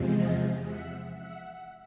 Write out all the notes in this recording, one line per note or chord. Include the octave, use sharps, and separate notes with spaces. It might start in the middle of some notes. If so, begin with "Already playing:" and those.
Already playing: E2 C3 F3 G#3
D#5 F5
E5 F#5
E5 F#5